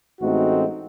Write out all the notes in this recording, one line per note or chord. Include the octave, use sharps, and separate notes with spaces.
A1 G#3 A3 C4 D#4 F#4